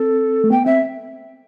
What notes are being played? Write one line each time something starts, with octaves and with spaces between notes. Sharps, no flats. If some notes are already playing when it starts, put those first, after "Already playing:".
Already playing: C4 A4
A3
B3 G5
C4 E5